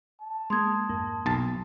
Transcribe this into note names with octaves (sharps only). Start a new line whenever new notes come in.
A5
G#3 A#3 C6 D#6 G#6
F2 G#2 A#3
B1 A5